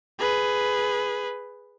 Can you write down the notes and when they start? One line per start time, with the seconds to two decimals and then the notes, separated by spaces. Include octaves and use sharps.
0.19 G#4 B4